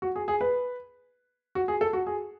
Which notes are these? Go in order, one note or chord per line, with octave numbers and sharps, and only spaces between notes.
F#4
G#4
G#4
B4
F#4
G#4
A4
F#4
G#4